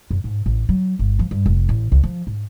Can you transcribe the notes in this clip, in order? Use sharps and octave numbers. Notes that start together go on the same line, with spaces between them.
F#2
G#2
A1
F#3
G1
F3
G2
F1
A1
C#2
F3
G#2